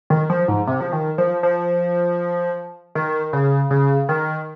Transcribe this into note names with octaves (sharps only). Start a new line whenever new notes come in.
D#3
F3
G#2
C3
F3
D#3
F3
F3
D#3
C#3
C#3
D#3